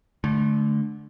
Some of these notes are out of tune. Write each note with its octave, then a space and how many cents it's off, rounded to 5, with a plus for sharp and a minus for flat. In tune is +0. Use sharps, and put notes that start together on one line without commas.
D3 +0 A3 -30